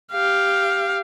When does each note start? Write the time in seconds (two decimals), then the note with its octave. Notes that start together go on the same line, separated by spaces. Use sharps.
0.12 G4 F5